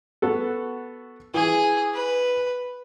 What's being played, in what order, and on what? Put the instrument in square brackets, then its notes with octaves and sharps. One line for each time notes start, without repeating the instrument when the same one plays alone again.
[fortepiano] B3 F#4 A4
[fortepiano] E3 [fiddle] G#4
[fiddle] B4